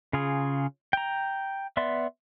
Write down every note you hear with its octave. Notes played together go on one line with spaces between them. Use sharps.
C#3 F4 G#4
G5 A#5
B3 D5 E5 C6